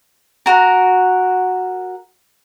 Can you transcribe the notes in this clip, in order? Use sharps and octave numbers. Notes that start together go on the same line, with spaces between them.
F#4 A#4